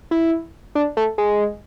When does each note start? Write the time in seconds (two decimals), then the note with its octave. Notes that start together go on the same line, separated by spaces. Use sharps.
0.11 E4
0.75 D4
0.97 A3
1.18 G#3